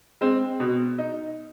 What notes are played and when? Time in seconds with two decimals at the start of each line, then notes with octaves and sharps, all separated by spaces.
0.21 G#3 C4
0.60 B2
0.98 D#4